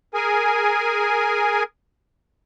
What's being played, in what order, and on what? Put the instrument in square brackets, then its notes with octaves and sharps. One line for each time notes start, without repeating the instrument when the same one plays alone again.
[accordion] G#4 A#4 G#5